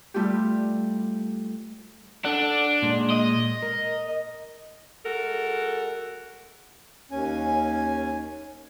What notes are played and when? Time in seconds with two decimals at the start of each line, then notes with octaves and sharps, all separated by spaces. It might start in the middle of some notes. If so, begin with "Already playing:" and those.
0.14 G3 A3 F4 G4
2.25 D4 A4 F#5
2.82 A#2 G#3
3.10 D#5
3.63 A#4
5.06 G#3 F#4 A4 A#4
7.11 D#2 C#4 G#5